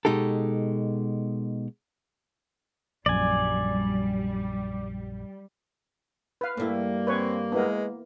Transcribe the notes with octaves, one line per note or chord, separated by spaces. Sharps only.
B2 G#3 D#4 G4 A4
A#1 F#2 G3 D5 G#5
B4 F5
G2 G3 A3 A#3 E4
C4 B4 C#5
G#3 B3 E4 A#4